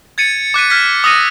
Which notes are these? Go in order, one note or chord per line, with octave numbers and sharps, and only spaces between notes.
G#6 A6 C#7 D#7
D6 F#6 B6 D#7
F6 G#6 B6
D#6 E6 F#6 A#6 C#7 D#7